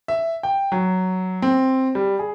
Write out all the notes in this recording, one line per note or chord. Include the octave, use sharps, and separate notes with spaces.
E5
G5
F#3
C4
G3
G#4